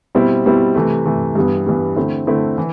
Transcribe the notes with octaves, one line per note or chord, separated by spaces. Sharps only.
B2 G3 C4 E4
B2 G3 C4 E4
C3 E3 A3
C3 E3 A3
G2 E3 G3 B3
G2 E3 G3 B3
D3 A3 C4 E4
D3 A3 C4 E4
E3